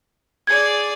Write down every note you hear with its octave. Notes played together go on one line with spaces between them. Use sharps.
G#4 D5 G#6